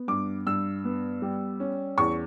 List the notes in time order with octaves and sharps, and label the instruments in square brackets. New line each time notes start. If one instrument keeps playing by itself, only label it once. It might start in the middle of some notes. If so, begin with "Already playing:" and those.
Already playing: [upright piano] B3
G2 D6
G2 E6
B3
G3
C#4
E2 C#6